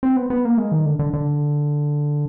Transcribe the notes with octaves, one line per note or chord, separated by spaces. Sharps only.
C4
B3
B3
A#3
G#3
D#3
D3
D3
D3